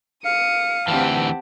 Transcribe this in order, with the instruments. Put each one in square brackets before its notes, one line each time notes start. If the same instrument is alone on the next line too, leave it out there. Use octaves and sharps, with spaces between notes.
[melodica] F5 [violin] D#6 [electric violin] C#7
[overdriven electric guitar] D2 E3 [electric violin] C4 A5 [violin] G4 F#5